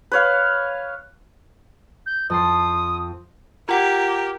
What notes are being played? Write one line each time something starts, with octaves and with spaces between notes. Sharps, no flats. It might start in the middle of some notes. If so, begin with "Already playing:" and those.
B4 C#5 F5
G6
F2 A5 C6 D#6
F4 G4 A#4 F#5